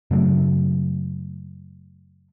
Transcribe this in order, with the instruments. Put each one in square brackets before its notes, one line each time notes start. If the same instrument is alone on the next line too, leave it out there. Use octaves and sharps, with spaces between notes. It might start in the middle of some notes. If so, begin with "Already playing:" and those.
[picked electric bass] F#2 C#3 F#3 A3